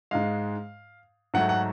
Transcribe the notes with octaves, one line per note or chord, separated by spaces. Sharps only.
G#2 G#3 F5
G#2 F#3 A3 F#5
F#5